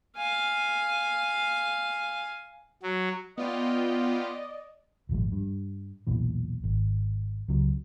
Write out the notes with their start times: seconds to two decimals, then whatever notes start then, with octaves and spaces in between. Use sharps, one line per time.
0.17 F5 G#5
2.83 F#3
3.38 B3 F4 D5 D#5 G5
5.09 D#1 G#1 F3 G#3
5.32 G2
6.07 B1 E2 A#2 E3
6.64 G#1
7.48 C#2 C#3 F#3